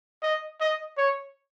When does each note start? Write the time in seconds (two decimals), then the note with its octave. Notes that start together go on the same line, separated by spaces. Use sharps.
0.22 D#5
0.60 D#5
0.97 C#5